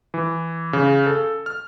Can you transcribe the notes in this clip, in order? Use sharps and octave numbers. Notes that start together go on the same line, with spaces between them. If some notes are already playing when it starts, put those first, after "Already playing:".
E3
C#3
A4
F6